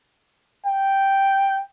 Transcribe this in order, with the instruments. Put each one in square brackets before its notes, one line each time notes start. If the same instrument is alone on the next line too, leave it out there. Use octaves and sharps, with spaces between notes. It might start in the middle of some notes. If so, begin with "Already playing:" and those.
[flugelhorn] G5